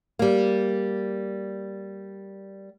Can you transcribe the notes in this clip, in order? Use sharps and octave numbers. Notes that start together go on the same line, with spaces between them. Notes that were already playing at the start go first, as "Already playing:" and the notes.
G3 A#3